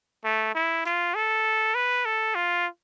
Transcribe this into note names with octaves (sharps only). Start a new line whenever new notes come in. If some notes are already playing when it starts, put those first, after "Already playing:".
A3
E4
F4
A4
B4
A4
F4